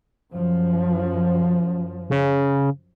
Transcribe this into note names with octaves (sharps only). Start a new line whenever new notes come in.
F#2 F3
C#3